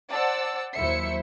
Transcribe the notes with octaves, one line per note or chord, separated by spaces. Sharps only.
C5 D5 F#5 A5 E6
D#2 F#3 E4 C5 E5 C#7